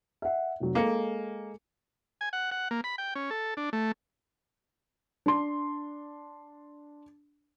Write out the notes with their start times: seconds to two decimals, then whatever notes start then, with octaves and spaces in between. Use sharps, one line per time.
0.22 E5 F#5
0.60 F1 F#3
0.75 G#3 A#3 A4 C#7
2.21 G#5
2.33 F#5
2.51 F#5
2.71 A#3
2.84 B5
2.98 G5
3.15 C#4
3.31 A4
3.57 D4
3.73 A3
5.26 D4 C6